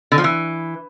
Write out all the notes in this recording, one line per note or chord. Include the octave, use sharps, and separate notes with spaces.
D3
F3
E3